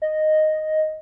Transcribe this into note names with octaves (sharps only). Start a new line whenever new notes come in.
D#5